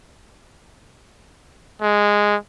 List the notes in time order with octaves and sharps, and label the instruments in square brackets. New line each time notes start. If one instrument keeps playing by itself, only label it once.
[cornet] G#3